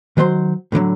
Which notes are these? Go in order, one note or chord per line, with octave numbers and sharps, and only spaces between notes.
D#3 F#3 C5 B5 C6
A2 D3 D#3 F#3